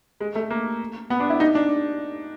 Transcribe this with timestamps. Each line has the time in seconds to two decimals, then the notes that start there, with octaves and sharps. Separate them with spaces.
0.21 G#3
0.35 A3
0.50 A#3
1.10 B3
1.20 D4
1.30 E4
1.40 D#4
1.55 D4